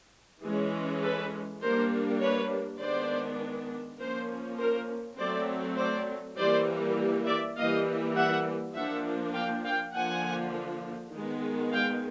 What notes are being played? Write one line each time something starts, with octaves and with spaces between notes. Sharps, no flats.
E3 G#3 C#4
A4 B4
G3 A#3 D4 A#4 C5
B4 C#5
D#3 G#3 B3 D4 C5 D5
F3 A#3 C#4 A#4 C5
A#4 C5
F#3 A3 C4 C5 D5
C5 D5
E3 G3 A#3 C5 D5
D5 E5
E3 G3 A#3 D#5 F5
E5 F#5
F3 A#3 D4 E5 F#5
F5 G5
F5 G5
D3 F3 A#3 D4 F#5 G#5
D#3 G#3 B3
F5 G5